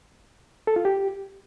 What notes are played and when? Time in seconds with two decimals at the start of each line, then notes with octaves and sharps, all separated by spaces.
0.67 A4
0.76 F4
0.85 G4